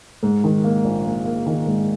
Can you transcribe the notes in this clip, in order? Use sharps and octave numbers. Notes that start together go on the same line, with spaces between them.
G#2
D#3
A#3
A#1
A#3
A#3
D#3
G#2